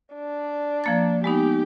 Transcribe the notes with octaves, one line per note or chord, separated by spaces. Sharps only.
D4
F3 A#3 A6
G#3 B3 D#4 G4